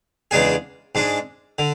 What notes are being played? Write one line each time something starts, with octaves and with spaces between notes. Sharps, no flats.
E2 C#3 G#3 D4 G#4
G#2 G#3 D4
D3